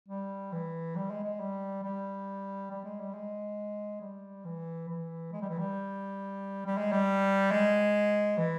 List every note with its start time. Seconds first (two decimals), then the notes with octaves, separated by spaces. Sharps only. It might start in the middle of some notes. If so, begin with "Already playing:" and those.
0.08 G3
0.53 E3
0.96 G3
1.11 G#3
1.24 G#3
1.40 G3
1.83 G3
2.70 G3
2.84 G#3
3.00 G3
3.14 G#3
4.01 G3
4.45 E3
4.89 E3
5.33 G#3
5.42 G3
5.49 E3
5.59 G3
6.67 G3
6.78 G#3
6.92 G3
7.51 G#3
8.38 E3